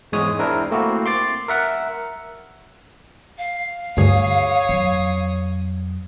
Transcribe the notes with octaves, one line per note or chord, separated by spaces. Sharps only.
E2 G#2 G#3 C#5 D#6
C4 D4 E4 A#4
A3 A#3 C4 E4 F#4
C6 D6 A6
A#4 E5 F#5
F5
D2 G2 F4 G#4 C#5 D#6
F2 F#3